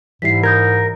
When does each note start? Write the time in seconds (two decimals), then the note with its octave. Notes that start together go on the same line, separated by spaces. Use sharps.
0.22 G#2 E3 G3 E4 B6 C7
0.43 A#4 D#6 G6 G#6